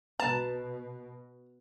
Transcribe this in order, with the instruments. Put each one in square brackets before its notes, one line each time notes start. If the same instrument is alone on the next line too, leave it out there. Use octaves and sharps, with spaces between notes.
[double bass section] B2 [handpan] B4 [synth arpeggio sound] A5 [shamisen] A#5